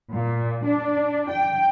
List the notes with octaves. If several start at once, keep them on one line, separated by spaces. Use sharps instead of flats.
A#2
D4
G5